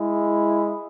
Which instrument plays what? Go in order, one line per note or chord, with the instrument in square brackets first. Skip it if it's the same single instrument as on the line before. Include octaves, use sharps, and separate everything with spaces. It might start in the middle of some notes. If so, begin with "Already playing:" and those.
Already playing: [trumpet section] G#3 E4